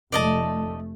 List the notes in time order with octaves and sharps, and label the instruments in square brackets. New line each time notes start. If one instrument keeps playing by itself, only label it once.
[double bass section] F1 A3 [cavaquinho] D5 D#5 A5